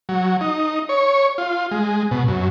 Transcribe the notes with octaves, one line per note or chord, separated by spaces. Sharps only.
F#3
D#4
C#5
F4
G#3
B2
F#2